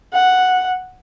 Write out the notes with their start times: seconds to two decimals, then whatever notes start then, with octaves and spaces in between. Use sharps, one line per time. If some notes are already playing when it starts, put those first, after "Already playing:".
0.13 F#5